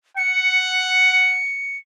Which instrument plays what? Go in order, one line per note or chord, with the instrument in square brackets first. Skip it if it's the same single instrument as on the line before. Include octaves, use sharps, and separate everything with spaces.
[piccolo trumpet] F#5 [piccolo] C#7